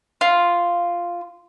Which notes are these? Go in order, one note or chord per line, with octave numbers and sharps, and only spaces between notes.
F4